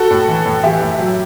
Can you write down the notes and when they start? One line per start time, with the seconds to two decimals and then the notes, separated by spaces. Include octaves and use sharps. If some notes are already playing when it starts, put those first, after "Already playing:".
Already playing: F#4 A4
0.11 A2
0.28 E3
0.46 A2
0.63 E3 E4 G4
0.82 A2
0.99 F#3